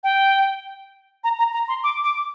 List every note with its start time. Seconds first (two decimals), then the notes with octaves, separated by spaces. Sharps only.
0.04 G5
1.24 A#5
1.39 A#5
1.53 A#5
1.68 C6
1.84 D6
2.04 D6